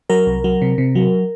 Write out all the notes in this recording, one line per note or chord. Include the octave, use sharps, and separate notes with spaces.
F#3 A#4
C2
F#3
C3
C3
F#3